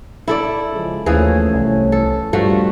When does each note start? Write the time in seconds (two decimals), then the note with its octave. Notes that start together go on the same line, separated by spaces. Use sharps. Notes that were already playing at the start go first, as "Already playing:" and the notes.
0.28 E4 A4 D5
0.72 C#3 F3 G#3
1.06 D#2 E3 F3 A3 C#4 G#4
1.54 C2
1.92 A4
2.33 G2 F3 G3 A3 F#4